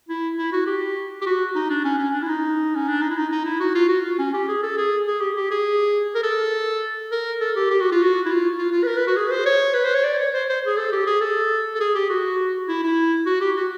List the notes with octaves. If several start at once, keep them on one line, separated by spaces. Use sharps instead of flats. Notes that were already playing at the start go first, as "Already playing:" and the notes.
E4
E4
F#4
G4
G4
F#4
D#4
D4
C#4
C#4
D4
E4
D#4
C#4
D4
D#4
E4
D#4
D#4
E4
F#4
F4
F#4
F4
C#4
G4
G#4
A4
G#4
G#4
G4
G4
G#4
A#4
A4
A#4
A4
G4
G4
F#4
F4
F#4
E4
F4
F4
F4
B4
A#4
B4
F#4
G#4
B4
C5
C#5
B4
C5
C#5
D5
C#5
C5
C5
G#4
A4
G4
G#4
A4
A4
G#4
G4
F#4
E4
E4
F#4
G4
F#4